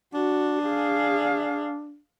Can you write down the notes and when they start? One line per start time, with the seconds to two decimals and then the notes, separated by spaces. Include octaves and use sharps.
0.14 D4 F#4
0.64 G#4 F5